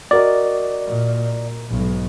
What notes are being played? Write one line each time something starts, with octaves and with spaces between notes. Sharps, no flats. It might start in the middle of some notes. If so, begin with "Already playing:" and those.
F#4 A#4 D5 D#5
A#2
B1 G#2